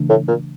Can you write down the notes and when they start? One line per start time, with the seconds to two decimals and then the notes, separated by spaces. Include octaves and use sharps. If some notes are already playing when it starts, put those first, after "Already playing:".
Already playing: C#3 E3 A3 D4
0.10 A2
0.28 A#2